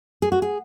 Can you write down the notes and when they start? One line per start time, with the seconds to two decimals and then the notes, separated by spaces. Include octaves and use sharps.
0.22 G#4
0.32 F#4
0.42 G#4